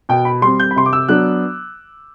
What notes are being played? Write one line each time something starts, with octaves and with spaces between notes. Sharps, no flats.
B2 G5
B5
G3 C4 C6
G6
B5
C3 C6
D6
E6
F#3 B3 D4 F#6